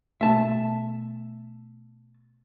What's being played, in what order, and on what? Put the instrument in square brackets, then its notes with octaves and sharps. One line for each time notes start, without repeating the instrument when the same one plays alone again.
[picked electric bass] B2 A3 [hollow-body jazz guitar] E5 A5